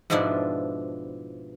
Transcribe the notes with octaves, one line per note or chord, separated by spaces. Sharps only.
G#2 B2 F3 D4 E4 D5